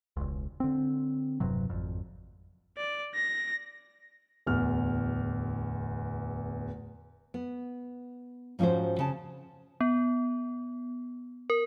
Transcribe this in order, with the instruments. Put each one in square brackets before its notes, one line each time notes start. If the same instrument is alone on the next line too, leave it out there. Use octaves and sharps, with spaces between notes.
[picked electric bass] E1 C#2
D3 C4
E1 G2 C3 F#3
G#1 F2
[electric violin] D5
A#6
[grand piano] D1 E2 F6
[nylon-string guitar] B3
G#2 F3 C#4 F4 F#4 C5
C#3 A5
[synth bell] B3
A#4